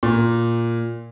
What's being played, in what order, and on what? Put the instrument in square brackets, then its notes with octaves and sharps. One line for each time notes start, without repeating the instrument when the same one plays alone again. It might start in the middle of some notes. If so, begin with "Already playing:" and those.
[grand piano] A#2